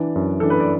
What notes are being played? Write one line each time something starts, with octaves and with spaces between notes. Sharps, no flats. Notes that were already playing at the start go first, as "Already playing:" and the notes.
Already playing: E3 D4 D5
F#2
E3 D4 A4
B4
D5